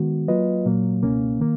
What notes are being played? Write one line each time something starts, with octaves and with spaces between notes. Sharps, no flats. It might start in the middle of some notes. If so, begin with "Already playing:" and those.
Already playing: D#3 G#3 B3 F#4
F#3 A#3 F4 B4 D#5
A#2 F#3 A#3
C#2 B2 A#3 C#4
D#3 A#3